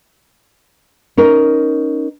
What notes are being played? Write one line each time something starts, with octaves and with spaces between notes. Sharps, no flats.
C#4 D#4 A#4